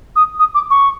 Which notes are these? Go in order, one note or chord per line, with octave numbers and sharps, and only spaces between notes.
D#6
D#6
D6
C#6